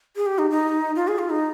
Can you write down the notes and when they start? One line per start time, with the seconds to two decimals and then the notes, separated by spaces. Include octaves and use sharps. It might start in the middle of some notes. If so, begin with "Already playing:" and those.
0.16 G#4
0.26 G4
0.38 D#4
0.50 D#4
0.95 F4
1.08 G#4
1.18 F4
1.30 D#4